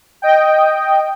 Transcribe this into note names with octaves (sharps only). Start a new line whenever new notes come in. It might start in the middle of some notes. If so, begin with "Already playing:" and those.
D#5 G5